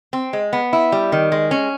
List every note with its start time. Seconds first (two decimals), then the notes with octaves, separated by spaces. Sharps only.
0.13 C4
0.33 G#3
0.53 B3
0.73 E4
0.92 G3
1.12 D#3
1.32 G#3
1.51 C#4